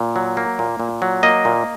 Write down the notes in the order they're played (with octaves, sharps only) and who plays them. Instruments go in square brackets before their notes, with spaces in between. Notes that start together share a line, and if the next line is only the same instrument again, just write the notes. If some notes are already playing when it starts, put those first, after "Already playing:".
Already playing: [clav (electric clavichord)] A#2
F#3
A#3
A#2
A#2
F#3
A#3 D#5
A#2